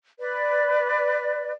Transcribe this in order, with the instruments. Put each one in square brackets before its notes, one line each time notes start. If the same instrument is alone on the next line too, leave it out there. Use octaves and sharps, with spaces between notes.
[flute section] B4 D5